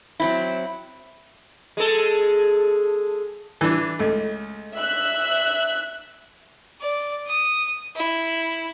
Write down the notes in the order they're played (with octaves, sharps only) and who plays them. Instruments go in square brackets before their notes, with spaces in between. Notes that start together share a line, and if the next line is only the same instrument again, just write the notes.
[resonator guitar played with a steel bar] F#3 C4 E4
[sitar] G#3 A4
[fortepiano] E3 D4
C#2 A3
[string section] E5 F#6
[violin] D5
D#6
E4